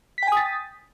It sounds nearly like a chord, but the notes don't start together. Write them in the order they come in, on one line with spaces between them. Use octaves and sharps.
B6 G5 G#5 D#6 A6